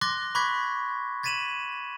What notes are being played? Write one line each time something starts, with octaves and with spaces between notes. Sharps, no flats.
C6 D6 F#6 A6 A#6
B5 C#6 D6 F#6 G#6 B6
G#6 A6 B6 D#7 E7 F#7